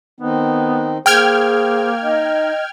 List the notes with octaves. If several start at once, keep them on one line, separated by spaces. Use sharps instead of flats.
D#3 B3 C4 D#4
A#3 G#4 C5 G5 F6 G#6
D#4 D#5